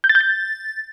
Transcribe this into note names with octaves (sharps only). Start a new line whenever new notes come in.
G6
A6
G6
A6